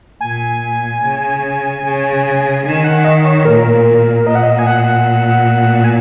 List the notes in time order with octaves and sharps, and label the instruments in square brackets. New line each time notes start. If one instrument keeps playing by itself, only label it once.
[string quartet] A#2 [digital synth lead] G#5
[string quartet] C#3
C#3
[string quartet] D#3 [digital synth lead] G#5
[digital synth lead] F#5
D#5
C#5
[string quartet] A#2 [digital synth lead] A#4
[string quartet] A#2 [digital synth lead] D#5
[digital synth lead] F#5
D#5
G#5
F#5
G#5